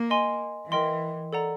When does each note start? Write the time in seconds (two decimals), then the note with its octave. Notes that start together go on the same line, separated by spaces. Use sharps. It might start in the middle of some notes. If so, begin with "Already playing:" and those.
Already playing: A#3
0.10 D#5 G#5 C6
0.71 E3 A#4 D#5 G5 C6
1.33 A4 D5 F#5 A#5